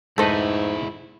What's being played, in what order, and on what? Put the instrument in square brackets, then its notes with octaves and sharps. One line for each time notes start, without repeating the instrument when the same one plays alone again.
[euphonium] G#2 [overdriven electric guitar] G#3 E4 [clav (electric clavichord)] A3 D#4 B4 [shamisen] A4 C5